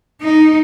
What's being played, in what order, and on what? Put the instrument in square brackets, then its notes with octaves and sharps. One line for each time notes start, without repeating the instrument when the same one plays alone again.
[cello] D#4